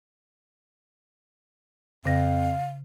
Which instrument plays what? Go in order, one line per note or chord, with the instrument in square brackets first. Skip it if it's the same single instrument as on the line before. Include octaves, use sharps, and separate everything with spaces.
[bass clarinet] F2 [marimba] C#3 A#6 [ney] F5